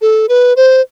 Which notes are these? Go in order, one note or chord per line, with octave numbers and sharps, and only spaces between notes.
A4
B4
C5